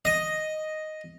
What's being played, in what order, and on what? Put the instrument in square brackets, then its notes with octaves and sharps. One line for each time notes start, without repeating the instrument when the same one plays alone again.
[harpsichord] D#5